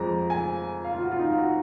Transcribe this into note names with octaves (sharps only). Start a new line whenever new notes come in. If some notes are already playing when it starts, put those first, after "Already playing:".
Already playing: F2 F3 G#3 A#5
G#5
F5
F4
F#4
F4
D#4
F#4